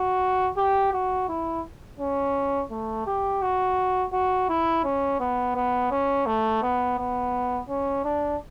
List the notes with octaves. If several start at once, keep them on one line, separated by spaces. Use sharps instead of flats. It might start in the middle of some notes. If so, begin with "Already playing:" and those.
Already playing: F#4
G4
F#4
E4
C#4
A3
G4
F#4
F#4
E4
C#4
B3
B3
C#4
A3
B3
B3
C#4
D4